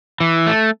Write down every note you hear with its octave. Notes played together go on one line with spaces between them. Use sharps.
E3
A3